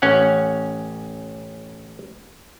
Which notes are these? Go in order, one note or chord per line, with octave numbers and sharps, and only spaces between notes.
A1 C#4 F#5